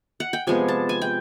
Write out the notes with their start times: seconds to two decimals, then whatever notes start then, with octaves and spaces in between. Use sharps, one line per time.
0.20 F#5
0.33 G5
0.47 C3 F3 G#3 B3 G#5
0.68 A5
0.89 G#5
1.02 G5